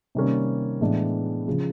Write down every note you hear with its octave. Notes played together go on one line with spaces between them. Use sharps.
C3 D#3 G3 A#3 C#4
A2 E3 G#3 B3 D4
C#3 F3